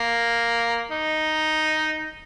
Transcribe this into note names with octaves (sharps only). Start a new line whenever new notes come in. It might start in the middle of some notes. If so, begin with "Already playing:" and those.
Already playing: A#3
D#4